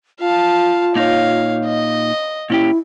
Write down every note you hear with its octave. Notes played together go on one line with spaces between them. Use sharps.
F4 F5 A5
A#2 D#4 C#5 F5
D#5
A#2 C#4 E4 G4